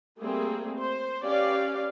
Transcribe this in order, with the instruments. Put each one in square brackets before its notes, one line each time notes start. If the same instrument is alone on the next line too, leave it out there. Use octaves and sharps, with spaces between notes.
[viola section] G3 A3 A#3 C4 G#4
C5
C#4 G4 B4 D5 F5